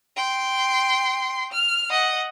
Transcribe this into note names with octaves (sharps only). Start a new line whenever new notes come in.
G5 C6
F6
D#5 F#5